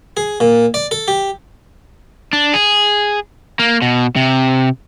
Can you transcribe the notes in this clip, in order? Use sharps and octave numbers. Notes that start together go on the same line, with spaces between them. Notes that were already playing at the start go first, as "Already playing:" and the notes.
G#4
A#2
D5
A4
G4
D4
G#4
A#3
B2
C3